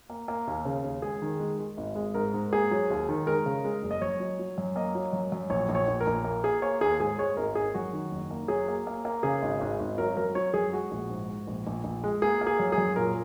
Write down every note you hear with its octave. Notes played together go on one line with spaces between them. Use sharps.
A#3
A#3
D#2
C#3
D#2
G#3 G#4
D#3
G#3
G#3
G#1
G#3
G#2 A#4
G#2
A#3 G#4
F#3
D#2
D#3
G#3 A#4
C#3
G#3
F#1
D#5
F#2 C#5
F#3
F#3
F#2
A#3 D#5
F#3
F#2
F#2
A#1 C#5
A#1
C#5
A#1
A#4
A#1
A#3
A#3 G#4
A#3 C#5
D#2 G#4
G#2 G#4
G#3 C#5
G#1 A#4
G#1 G#4
F#2 F#4
D#3
F#1
A#3
F#3 G#4
A#3
A#3
A#3
C#3 G#4
G#1
G#1
G#1
F#3 A#4
F#2 A#4
F#3 C#5
F#2 G#4
G#3 F#4
A#1
G#2
G#2
A#1
A#1
A#1
G#3
A#3 G#4
A#3
G#4
F#2
G#4
F#2
A#2 A#4